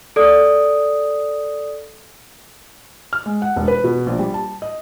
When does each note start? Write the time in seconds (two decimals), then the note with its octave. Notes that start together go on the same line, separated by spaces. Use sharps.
0.16 A4 D5 D#6
3.13 F6
3.26 G#3
3.42 F#5
3.56 E1
3.68 B4
3.84 B2
4.06 A#1
4.19 G3
4.34 A5
4.62 D#5